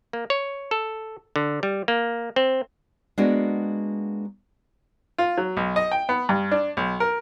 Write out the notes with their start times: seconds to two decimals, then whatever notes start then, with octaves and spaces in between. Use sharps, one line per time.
0.13 A#3
0.30 C#5
0.71 A4
1.36 D3
1.63 G3
1.88 A#3
2.36 C4
3.18 G#3 A#3 B3 D4 F#4 G#4
5.18 F4
5.37 F#3
5.57 B1
5.76 D#5
5.92 G5
6.09 B3
6.29 G2
6.51 D4
6.77 B1
7.00 A#4